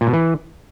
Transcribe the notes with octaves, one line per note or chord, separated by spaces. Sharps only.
A#2
B2
E3